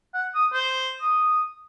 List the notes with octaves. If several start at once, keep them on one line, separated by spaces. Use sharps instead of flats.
F#5
D#6
C5
D#6